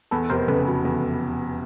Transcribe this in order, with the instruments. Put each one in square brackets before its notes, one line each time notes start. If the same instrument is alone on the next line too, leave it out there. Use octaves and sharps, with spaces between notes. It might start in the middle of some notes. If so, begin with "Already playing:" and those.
[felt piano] E2 [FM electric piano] A4 B4
[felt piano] F1 [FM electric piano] A#4 C5
[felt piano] C#3 [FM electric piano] A4 B4
[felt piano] F#3
E2